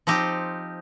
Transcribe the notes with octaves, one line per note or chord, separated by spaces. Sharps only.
F3 C4 D#4 G4